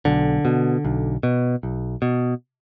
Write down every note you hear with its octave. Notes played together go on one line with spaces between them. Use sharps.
B1 D3
B2
B1
B2
B1
B2